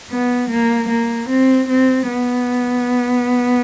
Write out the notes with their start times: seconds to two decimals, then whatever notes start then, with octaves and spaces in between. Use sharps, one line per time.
0.11 B3
0.50 A#3
0.89 A#3
1.30 C4
1.69 C4
2.09 B3